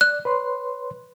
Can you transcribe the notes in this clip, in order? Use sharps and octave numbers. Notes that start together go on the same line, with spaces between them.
D5 F#6
B4 C#5 C6